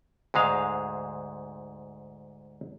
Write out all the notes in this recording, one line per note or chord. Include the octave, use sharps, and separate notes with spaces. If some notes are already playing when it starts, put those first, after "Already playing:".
D2 G#2 G#3 F5